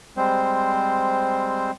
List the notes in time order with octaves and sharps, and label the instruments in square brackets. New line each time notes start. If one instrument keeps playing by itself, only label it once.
[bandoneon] G3 G#3 C4 C5